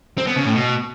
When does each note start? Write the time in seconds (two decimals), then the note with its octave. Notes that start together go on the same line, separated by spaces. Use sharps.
0.18 C4
0.27 B3
0.36 C#3
0.45 A2
0.55 B2